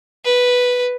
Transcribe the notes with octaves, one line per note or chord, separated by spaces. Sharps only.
B4